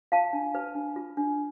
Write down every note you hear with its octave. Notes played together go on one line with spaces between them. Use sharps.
F4 F5 A5
D4
B4
D4
F4
D4